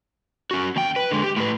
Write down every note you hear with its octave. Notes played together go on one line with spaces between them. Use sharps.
C#4 F#4
D#2 G5
B4
D3 G#3
G4
A2 B4